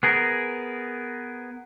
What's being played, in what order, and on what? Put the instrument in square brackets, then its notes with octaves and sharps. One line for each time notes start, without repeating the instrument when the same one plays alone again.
[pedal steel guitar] B3 G#4 A#4